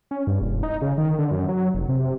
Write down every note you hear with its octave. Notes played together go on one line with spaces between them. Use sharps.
C#4
G2
E1
D#4
C#3
D#3
D3
F#2
F#3
F1
C3